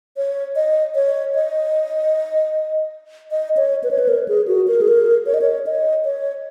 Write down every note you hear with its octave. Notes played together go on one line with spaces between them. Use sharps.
C#5
D#5
C#5
D#5
D#5
C#5
B4
C#5
B4
A#4
G#4
F#4
A#4
G#4
A#4
C#5
D#5
C#5
D#5
C#5